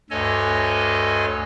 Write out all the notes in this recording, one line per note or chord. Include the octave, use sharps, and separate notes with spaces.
D2 G2 A4 C#5 D#5 G#5